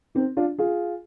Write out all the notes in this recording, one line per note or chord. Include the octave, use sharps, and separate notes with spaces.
C4 D#4
D4 F4
F4 G#4